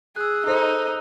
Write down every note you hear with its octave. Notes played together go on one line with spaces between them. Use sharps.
G#4 E6 F#6
D#4 A4 C5